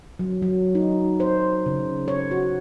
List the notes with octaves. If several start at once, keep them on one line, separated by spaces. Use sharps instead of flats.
F#3
F#3
D#4
C5
C#3
C#5
F#4